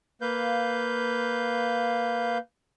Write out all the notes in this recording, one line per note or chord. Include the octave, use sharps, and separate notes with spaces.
A#3 B4 F5 G6